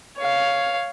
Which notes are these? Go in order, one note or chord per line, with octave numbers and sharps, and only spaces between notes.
C#5 F5